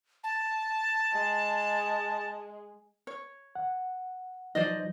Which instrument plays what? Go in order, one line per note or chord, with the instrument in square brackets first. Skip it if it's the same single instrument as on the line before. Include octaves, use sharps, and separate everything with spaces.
[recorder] A5
[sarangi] G#3
[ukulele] C#5
[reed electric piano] F#5
[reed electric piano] F3 F#3 D#4 [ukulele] C5 D5 D#5